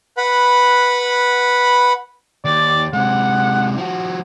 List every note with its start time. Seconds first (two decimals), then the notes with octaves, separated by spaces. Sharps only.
0.17 B4 F#5 B5
2.45 D#2 D5
2.93 C3 G#3 F#5
3.77 F3 F#4